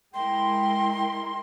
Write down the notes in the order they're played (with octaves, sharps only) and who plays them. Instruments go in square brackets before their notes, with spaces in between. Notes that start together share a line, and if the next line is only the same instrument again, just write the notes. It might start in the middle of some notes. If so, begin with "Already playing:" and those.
[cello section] G#3 E4 A#4 [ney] G5 [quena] C6